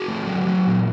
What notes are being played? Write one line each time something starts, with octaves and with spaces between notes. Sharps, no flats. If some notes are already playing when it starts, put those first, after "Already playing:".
Already playing: F#4 G#4
A3
F#3
F#3
A#2